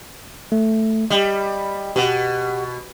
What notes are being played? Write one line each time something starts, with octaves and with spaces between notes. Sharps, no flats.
A3
G3 D#5
B2 G4 F#5